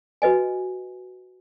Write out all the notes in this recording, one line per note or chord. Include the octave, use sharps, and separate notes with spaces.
F#4 B4 D#5 G#5